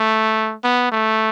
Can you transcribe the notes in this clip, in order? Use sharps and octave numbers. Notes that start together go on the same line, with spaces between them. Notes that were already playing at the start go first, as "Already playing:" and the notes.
Already playing: A3
B3
A3